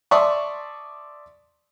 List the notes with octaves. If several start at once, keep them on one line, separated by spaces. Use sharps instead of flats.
D5 E5 A5 C6 C#6 D#6